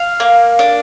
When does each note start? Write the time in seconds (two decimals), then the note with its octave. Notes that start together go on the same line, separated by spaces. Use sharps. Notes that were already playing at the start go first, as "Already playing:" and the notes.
Already playing: F5
0.20 A#3
0.59 D4